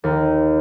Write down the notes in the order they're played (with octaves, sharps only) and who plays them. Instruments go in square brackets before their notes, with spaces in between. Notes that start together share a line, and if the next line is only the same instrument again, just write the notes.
[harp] D#2